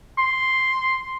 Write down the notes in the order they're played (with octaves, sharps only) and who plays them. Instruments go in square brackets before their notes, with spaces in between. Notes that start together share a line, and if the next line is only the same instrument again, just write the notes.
[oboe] C6